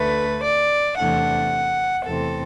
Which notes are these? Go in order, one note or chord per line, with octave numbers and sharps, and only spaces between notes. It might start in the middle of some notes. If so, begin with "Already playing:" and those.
Already playing: D2 D3 A3 B4
D5
E2 C3 E3 A3 D4 F#5
E2 C3 E3 A3 C4 A4